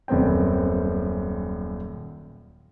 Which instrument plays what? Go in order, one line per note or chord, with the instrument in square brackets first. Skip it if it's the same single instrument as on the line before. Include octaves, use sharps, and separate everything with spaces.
[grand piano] D#1 F#2 B3 C4 G5